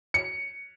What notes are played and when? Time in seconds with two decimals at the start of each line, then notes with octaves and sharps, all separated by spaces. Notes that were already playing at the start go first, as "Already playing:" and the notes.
0.14 C#7